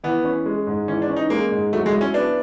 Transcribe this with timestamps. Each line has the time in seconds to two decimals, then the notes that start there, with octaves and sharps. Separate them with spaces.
0.04 E3 B3
0.24 C#4
0.46 G#3
0.67 G#2
0.88 E3 C#4
1.02 D4
1.09 C#4
1.16 D#4
1.30 G#3 A#3
1.51 G#2
1.73 F#3 A3
1.86 G#3
1.93 E4
2.01 C#4
2.14 B3 D4